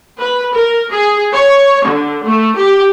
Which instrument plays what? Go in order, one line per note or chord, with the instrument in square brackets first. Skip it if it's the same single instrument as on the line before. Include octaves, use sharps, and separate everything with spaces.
[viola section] B4
A#4
G#4
C#5
D3
A3
G4